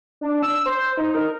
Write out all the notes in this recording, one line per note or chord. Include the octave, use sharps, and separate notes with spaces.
D4
E6
C5
D#4
A#4